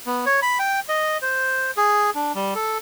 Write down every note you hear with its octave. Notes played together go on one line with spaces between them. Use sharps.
B3
C#5
B5
G5
D#5
C5
G#4
D4
G3
A4